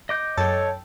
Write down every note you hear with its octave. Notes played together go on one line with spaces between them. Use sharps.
D#5 D6 G6
F#2 A4 C#5 G5 A6